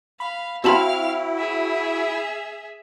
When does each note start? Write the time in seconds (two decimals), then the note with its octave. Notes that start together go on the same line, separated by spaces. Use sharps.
0.20 F5 B5
0.64 C4 E4 F#4 F5 A5 B5 F6
1.37 G#4 E5